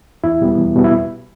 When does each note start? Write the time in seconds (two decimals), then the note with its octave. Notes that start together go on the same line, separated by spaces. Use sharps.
0.24 E2 E4
0.41 B2 G3 B3
0.58 E2
0.76 B2 G3 B3
0.84 E4